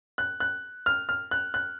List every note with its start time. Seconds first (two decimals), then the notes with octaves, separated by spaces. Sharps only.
0.18 F#6
0.40 F#6
0.86 F6
1.09 F6
1.31 F#6
1.54 F#6